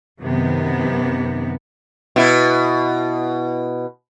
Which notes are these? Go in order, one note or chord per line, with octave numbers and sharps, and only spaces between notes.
F#2 C3 D#3 B3
B2 E4